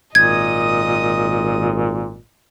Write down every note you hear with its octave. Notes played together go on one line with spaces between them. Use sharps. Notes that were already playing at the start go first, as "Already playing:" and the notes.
G#1 A#2 D#5 D#6 G#6